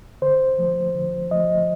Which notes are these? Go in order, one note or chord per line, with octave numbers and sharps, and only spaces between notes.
D3 C5
F3 A3
D3
F3 A3 D#5